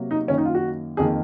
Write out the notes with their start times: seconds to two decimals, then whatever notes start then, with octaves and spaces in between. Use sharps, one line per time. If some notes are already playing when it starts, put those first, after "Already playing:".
Already playing: C3 F#3 A#3
0.11 D#4
0.28 F#2 D#3 A#3 C#4
0.38 D#4
0.45 F4
0.55 F#4
0.97 F2 D#3 A#3 G#4